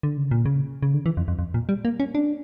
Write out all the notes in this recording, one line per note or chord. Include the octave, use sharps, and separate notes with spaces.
D3
C#3
A#2
C#3
C#3
D3
E3
F2
F2
F2
A#2
G3
A#3
C#4
D4